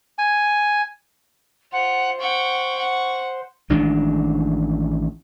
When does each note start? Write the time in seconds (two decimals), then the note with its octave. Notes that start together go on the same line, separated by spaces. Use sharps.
0.18 G#5
1.72 F4 C5 F#5
2.20 F#5 G5 C#6
2.79 F#5
3.70 A1 D#3 G#3 D4